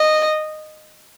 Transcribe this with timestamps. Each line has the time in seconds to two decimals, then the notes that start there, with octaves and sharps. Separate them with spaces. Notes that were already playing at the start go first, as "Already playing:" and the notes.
Already playing: D#5